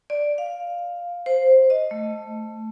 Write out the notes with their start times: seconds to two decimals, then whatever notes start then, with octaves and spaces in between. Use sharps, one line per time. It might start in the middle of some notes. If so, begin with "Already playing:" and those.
0.10 D5
0.38 F5
1.26 C5
1.70 D#5
1.91 A3